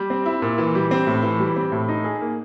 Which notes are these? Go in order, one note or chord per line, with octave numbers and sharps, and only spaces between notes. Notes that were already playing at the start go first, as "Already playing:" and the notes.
Already playing: G3
C4
E4
A#2
E3
G3
C4
A2
E3
G3
C4
A2
D#4
G#4
A#3